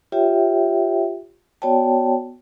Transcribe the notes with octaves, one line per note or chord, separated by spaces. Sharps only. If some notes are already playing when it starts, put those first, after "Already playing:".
F4 G4 C#5 E5 G5
B3 F#4 C#5 D5 G5 A5